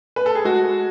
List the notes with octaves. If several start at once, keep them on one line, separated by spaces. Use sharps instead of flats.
B4
A4
G#4
G#3 F#4